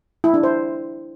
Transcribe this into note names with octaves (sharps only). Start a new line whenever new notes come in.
E4
D4
C5